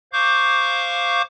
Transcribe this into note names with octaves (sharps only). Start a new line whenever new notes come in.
C5 F5 C#6 D6 G6